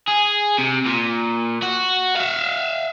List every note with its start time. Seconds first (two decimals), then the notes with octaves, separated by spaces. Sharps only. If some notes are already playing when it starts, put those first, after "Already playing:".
0.08 G#4
0.58 C3
0.86 A#2
1.63 F#4
2.17 E5 F5